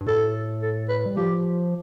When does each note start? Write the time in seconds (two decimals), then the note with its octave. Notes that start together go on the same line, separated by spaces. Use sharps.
0.01 G2
0.06 A2 A4
0.62 A4
0.89 B4
1.06 G3
1.17 F3 G4